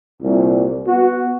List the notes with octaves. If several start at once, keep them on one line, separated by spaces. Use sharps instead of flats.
C2 A#2 G3
B3 F#4